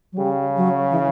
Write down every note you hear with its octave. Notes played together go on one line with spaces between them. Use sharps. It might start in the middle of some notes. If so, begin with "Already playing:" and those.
F#3
C#3 G3
F#3
E3